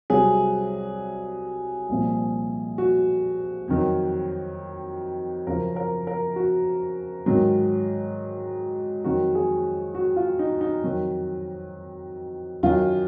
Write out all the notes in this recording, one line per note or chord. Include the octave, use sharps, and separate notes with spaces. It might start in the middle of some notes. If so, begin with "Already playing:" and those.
C2 C3 F#3 G#4
C2 A#2 F3
F#4
F2 D#3 F#3
F#2 C#3 F3 A#4
A#4
A#4
F#4
G#2 D#3 F#3
F2 D#3 F#3 F#4
G#4
F#4
F4
D#4
D#4
F2 D#3 F#3
F#2 D#3 F#3 F4